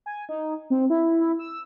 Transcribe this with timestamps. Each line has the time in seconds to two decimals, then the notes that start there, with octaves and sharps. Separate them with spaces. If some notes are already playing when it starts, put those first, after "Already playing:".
0.06 G#5
0.29 D#4
0.70 C4
0.90 E4
1.20 E4
1.39 E6